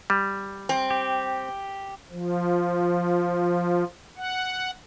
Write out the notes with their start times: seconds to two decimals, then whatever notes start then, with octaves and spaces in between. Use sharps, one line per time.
0.10 G3
0.69 C4
0.90 G4
2.11 F3
4.17 F#5